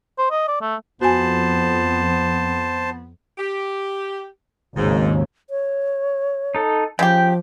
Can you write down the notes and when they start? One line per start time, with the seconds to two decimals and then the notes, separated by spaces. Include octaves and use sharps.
0.18 C5
0.31 D#5
0.48 D5
0.61 A3
1.01 F2 B3 F#4 C5 G#5 A5
3.38 G4
4.76 G#1 D#2 G#2 C#3
5.50 C#5
6.55 D#4 A4
6.99 C#3 F3 E4 G4 G5